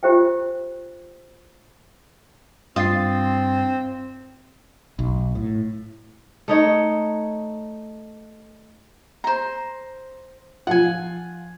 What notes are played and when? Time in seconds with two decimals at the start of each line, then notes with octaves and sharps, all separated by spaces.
0.03 F4 G4 C5 E5 G5
2.76 G2 C4 F4 D#6 A6 C7
4.99 B1
5.35 A2
6.48 A3 D#4 C#5 E5
9.24 C5 A#5
10.67 F3 F4 F#5 G#5